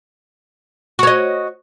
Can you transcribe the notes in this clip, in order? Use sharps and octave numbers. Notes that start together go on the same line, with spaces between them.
F#4 C#5 D#5